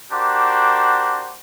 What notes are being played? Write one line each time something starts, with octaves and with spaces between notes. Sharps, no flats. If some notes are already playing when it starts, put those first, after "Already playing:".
D4 F#4 G4 A#4 C5